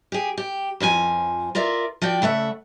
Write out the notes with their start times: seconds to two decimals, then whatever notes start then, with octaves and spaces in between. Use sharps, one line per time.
0.12 G4 G#4
0.38 G4
0.80 F2 F3 G4 G#5
1.55 F4 A#4 D5 E5
2.02 F3 F#4 D5 G5
2.22 C#3 A3 E5 F#5